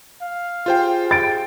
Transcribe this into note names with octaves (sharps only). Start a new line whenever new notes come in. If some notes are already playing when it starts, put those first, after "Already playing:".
F5
F4 G4 G#4 C5 G5
A6 D7